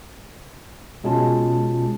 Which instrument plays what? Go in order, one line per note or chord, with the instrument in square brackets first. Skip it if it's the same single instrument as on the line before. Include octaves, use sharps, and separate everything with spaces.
[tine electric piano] B2 G#3 C#4 F4 A5